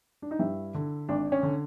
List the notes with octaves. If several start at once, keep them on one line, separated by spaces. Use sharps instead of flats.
D4
D#4
G2 E4
D3
G#1 D4
C#4
D3